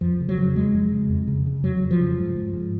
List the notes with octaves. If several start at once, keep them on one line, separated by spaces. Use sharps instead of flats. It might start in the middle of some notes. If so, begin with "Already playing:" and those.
F2 F3
C#3
F#3
C#3
F2 G#3
F2
C#3
F2
C#3
C#3
F2 F#3
F2
F3
C#3
G#2
G#2
G#2